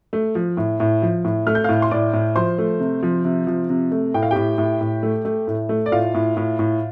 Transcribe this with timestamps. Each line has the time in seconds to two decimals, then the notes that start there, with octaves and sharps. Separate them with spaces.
0.13 A3
0.35 F3
0.57 A2
0.80 A2
1.02 F3
1.25 A2
1.47 A3 F6
1.55 G6
1.64 A2 F5 F6
1.82 C6
1.91 A2 D5 D6
2.13 A2
2.36 F3 C5 C6
2.58 A3
2.80 C3
3.03 F3
3.25 C3
3.47 F3
3.70 C3
3.92 A3
4.14 A2 G5
4.22 F5
4.31 A2 G4 G5
4.58 A2
4.81 A2
5.03 A3
5.25 A3
5.48 A2
5.69 A3
5.86 D5
5.92 A2 F4 F5
6.14 A2
6.37 A2
6.59 A2